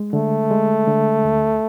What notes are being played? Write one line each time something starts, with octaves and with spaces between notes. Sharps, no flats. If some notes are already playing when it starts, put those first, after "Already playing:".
Already playing: G#3
D3 A3
G#3
D3
D2